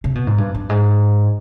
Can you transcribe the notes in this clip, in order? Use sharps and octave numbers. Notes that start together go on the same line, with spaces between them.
C3
B2
G#2
G2
G2
G#2